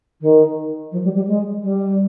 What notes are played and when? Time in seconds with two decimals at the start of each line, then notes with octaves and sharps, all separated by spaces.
0.21 D#3
0.92 F3
1.04 G3
1.15 G3
1.27 G#3
1.62 G3